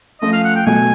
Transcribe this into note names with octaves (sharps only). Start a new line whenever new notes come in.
F3 A3 C#4 F4 D#5
F5
F#5
G5
B2 F#3 A3 G#5